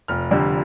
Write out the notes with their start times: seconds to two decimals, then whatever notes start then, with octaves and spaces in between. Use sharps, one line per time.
0.08 F1 F6
0.31 F2 D3 G3